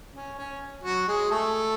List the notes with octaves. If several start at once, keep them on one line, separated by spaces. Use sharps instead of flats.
C#4
C#4
F#3 F#4
G#3 G#4
A3 A4